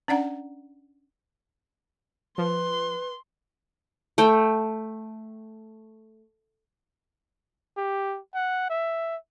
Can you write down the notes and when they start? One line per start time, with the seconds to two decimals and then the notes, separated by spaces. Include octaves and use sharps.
0.08 C#4 D4 D5 F#5 A#5
2.38 F3 B4 C6
4.18 A3 G5
7.77 G4
8.34 F#5
8.69 E5